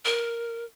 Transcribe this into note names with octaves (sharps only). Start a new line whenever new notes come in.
A#4